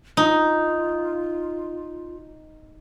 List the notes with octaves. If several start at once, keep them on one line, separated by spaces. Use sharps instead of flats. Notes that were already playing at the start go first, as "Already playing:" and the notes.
D#4 F4